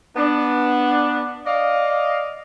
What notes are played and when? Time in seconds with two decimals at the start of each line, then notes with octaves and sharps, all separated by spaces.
0.16 B3 D4
1.46 D5 D#5 F5